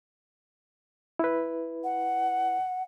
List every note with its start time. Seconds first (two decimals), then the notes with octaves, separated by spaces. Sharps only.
1.19 E4 B4
1.84 F#5